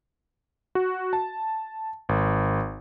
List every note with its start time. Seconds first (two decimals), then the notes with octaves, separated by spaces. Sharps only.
0.75 F#4
1.13 A5
2.09 G#1